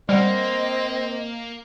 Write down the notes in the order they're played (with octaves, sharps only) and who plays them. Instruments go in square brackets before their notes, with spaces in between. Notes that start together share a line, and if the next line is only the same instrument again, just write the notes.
[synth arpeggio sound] G3 F#5 [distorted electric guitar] A#3 [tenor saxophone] C4 [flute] D#5